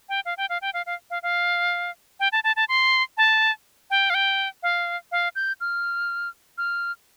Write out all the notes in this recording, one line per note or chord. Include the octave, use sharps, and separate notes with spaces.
G5
F5
G5
F5
G5
F5
F5
F5
F5
G5
A5
A5
A5
C6
A5
G5
F5
G5
F5
F5
G6
F6
F6